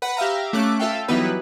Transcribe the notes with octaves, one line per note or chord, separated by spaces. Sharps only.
B4 F#5
G4 E5 F5 A#5
A3 C#4 D6 F#6
F4 A4 E5 F5 G5
E3 F#3 G3 B3 D#4 B4